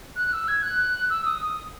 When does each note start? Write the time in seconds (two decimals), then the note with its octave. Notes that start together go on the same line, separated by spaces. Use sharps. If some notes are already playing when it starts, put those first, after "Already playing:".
0.16 F#6
0.33 E6
0.48 G#6
0.63 F#6
1.10 E6
1.25 D#6
1.42 D#6